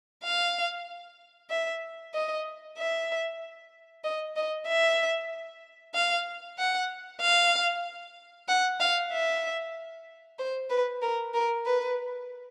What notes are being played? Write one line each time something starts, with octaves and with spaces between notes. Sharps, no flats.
F5
E5
D#5
E5
D#5
D#5
E5
F5
F#5
F5
F#5
F5
E5
C5
B4
A#4
A#4
B4